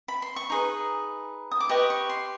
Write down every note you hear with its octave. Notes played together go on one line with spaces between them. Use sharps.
B5
C6
C#6
D#4 G#4 B4
D#6
D6
G4 B4 D#5 C#6
C#6
C6